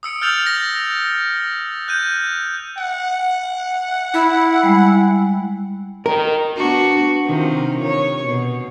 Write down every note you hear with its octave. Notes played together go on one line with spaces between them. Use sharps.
D#6 E6 C#7 D7
F6 G6 A6 F7 F#7
A#6
F#6 G6 D#7
F#5
E4
G3 G#3
D#3 A#4
B3 D4 F#4
C3 D#3 F4
D#3 C#5
B2